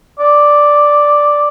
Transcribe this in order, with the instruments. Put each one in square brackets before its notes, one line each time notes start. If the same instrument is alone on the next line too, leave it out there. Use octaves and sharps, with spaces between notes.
[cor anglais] D5